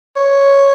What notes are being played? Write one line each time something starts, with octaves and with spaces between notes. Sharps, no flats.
C#5